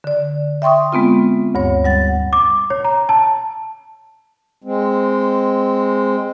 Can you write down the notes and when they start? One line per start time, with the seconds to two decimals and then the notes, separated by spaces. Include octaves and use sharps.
0.04 D3 D5
0.62 E5 G5 C6 C#6 D#6
0.93 G#3 B3 C4 F4
1.55 D2 G2 C#5
1.85 G3 F#5 A6
2.33 D6
2.70 C#5
2.85 A#5
3.09 A5
4.64 G#3 C4